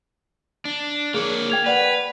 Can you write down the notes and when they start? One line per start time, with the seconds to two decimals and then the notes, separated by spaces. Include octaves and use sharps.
0.65 D4
1.14 A#3 G#4 C#5
1.50 G5 G#6 F7
1.66 B4 D5 F#5 F7